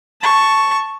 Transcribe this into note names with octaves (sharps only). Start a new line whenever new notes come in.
A5 C#6